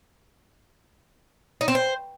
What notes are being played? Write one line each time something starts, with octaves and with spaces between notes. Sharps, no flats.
D#4
C4
C5